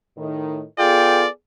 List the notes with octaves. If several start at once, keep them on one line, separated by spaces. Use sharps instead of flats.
A2 D#3
B3 F4 G#4 A4 D5 G5